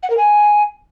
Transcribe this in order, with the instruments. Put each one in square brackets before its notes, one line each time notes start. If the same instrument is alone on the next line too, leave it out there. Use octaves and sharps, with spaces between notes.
[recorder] F#5
A#4
G#5